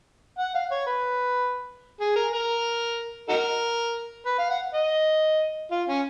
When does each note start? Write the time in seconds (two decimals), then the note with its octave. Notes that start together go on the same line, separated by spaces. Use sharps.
0.39 F#5
0.55 F5
0.71 C#5
0.87 B4
2.01 G#4
2.16 A#4
2.33 A#4
3.29 D#4 F#4 A#4
4.26 B4
4.39 F5
4.50 F#5
4.74 D#5
5.71 F4
5.88 C#4